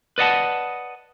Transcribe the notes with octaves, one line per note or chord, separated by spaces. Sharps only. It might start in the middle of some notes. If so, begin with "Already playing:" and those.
B4 D5 D#5 F#5 A5